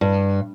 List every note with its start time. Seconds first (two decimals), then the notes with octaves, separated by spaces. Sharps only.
0.01 G2